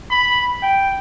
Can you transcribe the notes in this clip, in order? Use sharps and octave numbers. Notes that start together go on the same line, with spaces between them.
B5
G5